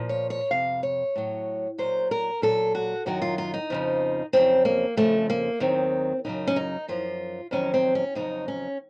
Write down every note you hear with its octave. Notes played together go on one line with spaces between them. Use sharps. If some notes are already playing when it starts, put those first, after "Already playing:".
Already playing: A#2 F3
C#5
C#5
F2 C3 F5
C#5
A2 F#3
A#2 F#3 C5
A#4
A#2 F#3 A4
F#4
F#2 D#3 F#3 F#4
F4
F4
D#4
F2 C#3 F3
F2 C#3 F#3 C4
A#3
F2 C#3 F3 A3
A#3
D#2 D#3 F#3 C4
F#2 C#3 F#3 D#4
C#4
D#4
F#2 F3 F4
F2 D#3 F#3 C#4
C4
C#4
F2 C#3 F#3 D#4
C#4